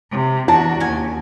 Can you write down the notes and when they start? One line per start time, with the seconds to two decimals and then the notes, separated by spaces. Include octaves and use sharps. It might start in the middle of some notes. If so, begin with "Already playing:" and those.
0.11 C3
0.48 E2 D4 E4 F#4 A5
0.80 D#2 C#4 G#5